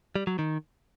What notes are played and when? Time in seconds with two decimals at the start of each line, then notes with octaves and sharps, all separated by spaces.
0.16 G3
0.27 F#3
0.39 D#3